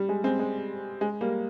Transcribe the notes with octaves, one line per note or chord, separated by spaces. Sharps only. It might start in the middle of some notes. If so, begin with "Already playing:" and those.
Already playing: G3
G#3
G#3 C4
G#3
G#3
G3 A#3